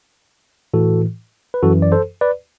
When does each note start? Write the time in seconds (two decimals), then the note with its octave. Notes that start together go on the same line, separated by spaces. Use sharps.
0.74 A2 E3 F#4 A4
1.54 B4
1.63 F#2 E3 F#4 A4
1.82 D5
1.92 A4 C5
2.21 B4 D5